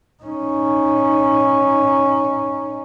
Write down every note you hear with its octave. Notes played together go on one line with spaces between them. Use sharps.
C#4 D#4